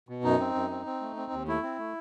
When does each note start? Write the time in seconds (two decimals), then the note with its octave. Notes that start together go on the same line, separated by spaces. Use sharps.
0.09 B2
0.24 F#2 D#4
0.39 C4
0.55 F#2
0.70 C4
0.86 C4
1.01 A3
1.17 C4
1.32 D#2
1.47 A3 E4
1.63 C4
1.78 A3